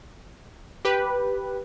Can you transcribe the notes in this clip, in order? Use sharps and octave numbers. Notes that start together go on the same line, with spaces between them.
G4 B4